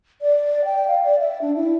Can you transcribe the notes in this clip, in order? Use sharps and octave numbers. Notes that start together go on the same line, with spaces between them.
D5
G5
F5
D5
E5
D4
E4